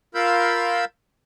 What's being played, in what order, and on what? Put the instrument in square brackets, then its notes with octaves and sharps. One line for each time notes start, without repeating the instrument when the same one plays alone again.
[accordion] F4 A#4 F5 B5 E6 G6